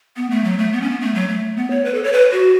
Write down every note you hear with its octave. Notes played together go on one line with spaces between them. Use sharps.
B3
A3
F#3
A3
B3
C#4
B3
A3
F#3
A3
B3
C#5
B4
A4
C#5
B4
F#4